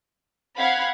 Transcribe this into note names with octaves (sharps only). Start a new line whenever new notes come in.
C4 F5 F#5 B5 G#6